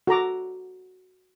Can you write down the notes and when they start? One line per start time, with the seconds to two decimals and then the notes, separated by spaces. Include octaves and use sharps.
0.07 F#4 A4 A#5 D6